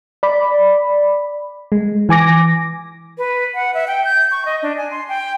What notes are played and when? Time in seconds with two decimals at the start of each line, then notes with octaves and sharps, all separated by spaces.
0.23 D5 B5
1.72 G#3
2.09 E3 G#5 D6 A#6
3.18 B4
3.54 F#5
3.74 E5
3.87 G5
4.05 G6
4.31 C#6
4.45 D#5
4.63 D4
4.77 G#5
4.91 C6
5.09 G5